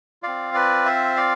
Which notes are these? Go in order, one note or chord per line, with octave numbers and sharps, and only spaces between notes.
C4 F4 D5 F5
B4 D5
C5 E5
D5 F5